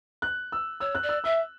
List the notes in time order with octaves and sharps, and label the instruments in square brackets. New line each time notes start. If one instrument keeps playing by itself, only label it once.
[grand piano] F#6
E6
[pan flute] C#5 [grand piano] E6
[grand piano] F#6
[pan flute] D5
[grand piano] E6
[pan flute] E5 [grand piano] E6